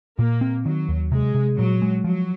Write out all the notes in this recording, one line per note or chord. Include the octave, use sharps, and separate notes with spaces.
A#2 A#3
C4
D#3 F#3
D#2
C3 G#3
C3
A#2 F#3
G#3
F3 F#3